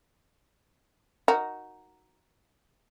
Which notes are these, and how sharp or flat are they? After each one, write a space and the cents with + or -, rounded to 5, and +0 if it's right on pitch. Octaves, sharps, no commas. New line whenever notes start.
D#4 +0 F#4 +0 A#4 +0